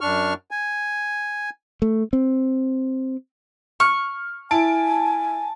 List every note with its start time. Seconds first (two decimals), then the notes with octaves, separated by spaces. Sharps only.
0.01 F#2 D4 C#6 F6
0.51 G#5
1.82 A3
2.13 C4
3.80 C#6 F6
4.51 E4 G#5 A5 D7